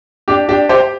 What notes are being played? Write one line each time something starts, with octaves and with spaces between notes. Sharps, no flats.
D4 G4
D4 G4
G4 C5